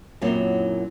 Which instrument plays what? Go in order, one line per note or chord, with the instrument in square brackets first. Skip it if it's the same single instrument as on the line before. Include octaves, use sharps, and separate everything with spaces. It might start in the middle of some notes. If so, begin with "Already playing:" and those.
[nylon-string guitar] F#2 A#2 F#3 C4 E4